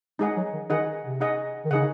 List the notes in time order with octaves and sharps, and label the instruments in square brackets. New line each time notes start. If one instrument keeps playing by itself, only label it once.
[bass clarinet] G#3 [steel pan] D#4 G#4 D#5 F#5
[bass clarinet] F#3
D#3
[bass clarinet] D#3 [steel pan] D#4 G#4 D#5 F#5
[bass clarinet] C3
[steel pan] D#4 G#4 D#5 F#5
[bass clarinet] D#3
[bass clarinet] C#3 [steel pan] D#4 G#4 D#5 F#5